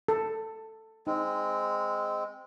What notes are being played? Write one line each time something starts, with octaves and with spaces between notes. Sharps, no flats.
A4
G#3 C4 D#4